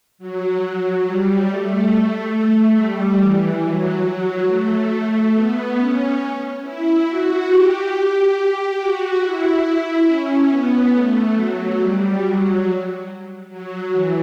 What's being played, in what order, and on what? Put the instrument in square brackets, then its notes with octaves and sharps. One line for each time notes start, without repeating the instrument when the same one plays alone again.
[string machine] F#3
F#3
G3
A3
G3
E3
F#3
F#3
A3
B3
C#4
E4
F#4
G4
F#4
E4
C#4
B3
A3
F#3
G3
F#3
F#3
E3